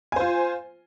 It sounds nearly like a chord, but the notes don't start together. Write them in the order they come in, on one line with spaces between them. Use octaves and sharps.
G#5 C5 F4